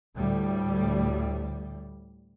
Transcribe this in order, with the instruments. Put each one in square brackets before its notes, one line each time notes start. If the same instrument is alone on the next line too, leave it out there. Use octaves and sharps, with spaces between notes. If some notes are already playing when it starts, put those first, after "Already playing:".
[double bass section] D2 A2 G3